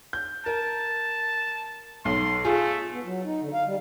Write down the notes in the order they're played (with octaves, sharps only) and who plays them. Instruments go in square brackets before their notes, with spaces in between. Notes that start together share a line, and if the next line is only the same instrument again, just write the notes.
[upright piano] G6
[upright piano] A#4 [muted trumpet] A5
[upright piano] B1 [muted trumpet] C6
[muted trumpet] A3 [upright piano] F4 G#4
[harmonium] B3
F#3
D#4
D3
F5
G3